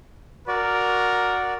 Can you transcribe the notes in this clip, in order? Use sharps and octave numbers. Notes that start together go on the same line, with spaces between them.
F#4 A#4 D5